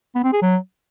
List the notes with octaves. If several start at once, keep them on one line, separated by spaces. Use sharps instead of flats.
B3
C4
G#4
F#3